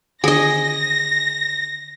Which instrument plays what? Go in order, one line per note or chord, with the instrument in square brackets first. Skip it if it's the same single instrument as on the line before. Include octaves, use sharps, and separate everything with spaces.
[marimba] D3 D#3 D4 [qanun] G#4 D#5 [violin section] A#6